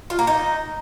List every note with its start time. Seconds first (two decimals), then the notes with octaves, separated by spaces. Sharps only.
0.10 F4
0.19 A#3
0.27 D#4